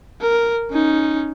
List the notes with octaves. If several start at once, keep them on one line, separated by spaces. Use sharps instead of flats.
A#4
C#4 D#4